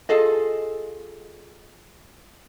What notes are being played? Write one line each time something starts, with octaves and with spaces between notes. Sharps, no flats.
F4 G#4 A4 D#5